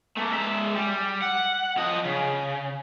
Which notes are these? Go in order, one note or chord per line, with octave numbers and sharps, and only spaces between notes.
A3 A#3
G#3 E5
G3
F#5
F3 D#5
C#3